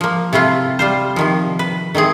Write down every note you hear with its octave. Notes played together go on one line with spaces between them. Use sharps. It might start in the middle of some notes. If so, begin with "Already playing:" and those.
F3 A#3
C3 A3 E4 F4
G3 F4 C5
C3 D#3 F3
B4
D#3 A3 C4 G#4